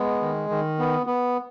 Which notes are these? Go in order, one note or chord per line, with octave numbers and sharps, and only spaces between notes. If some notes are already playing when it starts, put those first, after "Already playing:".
Already playing: G#3 B3
D#3
D#3
B3
B3